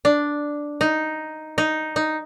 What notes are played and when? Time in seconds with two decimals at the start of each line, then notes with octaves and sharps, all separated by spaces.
0.05 D4
0.81 D#4
1.58 D#4
1.96 D#4